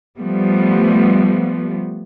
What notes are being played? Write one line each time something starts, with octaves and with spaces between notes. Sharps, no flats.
F3 G3 A3 B3